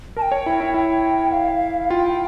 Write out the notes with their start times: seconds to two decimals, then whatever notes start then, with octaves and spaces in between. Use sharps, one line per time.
0.17 A#4 A5
0.22 G5
0.32 C#5
0.46 E4
0.60 E4
0.74 E4 G5
1.32 F5
1.90 F4 G5